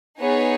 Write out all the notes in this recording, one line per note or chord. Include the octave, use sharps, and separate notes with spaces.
B3 D#4 G#4 C#5